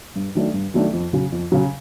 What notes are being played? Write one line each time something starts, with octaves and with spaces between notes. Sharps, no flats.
G2
D#3 F#3 A3 D4
G2
D#3 F#3 A3 D4
F2
C#3 F#3
F2
C#3 F#3